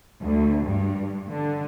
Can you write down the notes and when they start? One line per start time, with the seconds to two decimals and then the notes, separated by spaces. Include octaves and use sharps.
0.21 D2
0.65 G2
1.30 D3